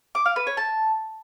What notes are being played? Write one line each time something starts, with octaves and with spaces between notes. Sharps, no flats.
D6
F5
B4
C#5
A5